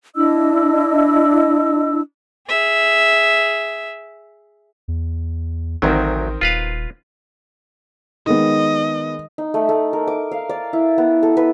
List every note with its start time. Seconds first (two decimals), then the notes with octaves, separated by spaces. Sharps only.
0.16 D4 E4 D#5 E6
2.48 G#4 E5
4.88 E2
5.82 A1 D2 D#3 F#3 C4 A#4
6.41 D#1 F4 B4 F5
8.26 D#3 G#3 B3 D#5
9.38 D#4
9.54 A3
9.69 A3
9.93 A#4
10.07 D6
10.31 F5
10.49 D5
10.73 E4
10.98 B3
11.23 A4
11.37 B4